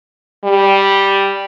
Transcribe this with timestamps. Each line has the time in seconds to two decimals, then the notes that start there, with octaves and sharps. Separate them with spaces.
0.44 G3